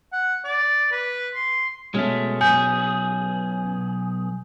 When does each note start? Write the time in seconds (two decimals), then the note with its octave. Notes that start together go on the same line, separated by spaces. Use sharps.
0.12 F#5
0.45 D5
0.91 B4
1.35 C6
1.94 B2 G#3 A3 C#4 F6
2.41 B1 G#4 G#5 G6